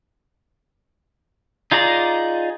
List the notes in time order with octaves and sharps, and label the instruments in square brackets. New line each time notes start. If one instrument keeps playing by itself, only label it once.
[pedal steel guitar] D#4 F4 G#4 D5 A#5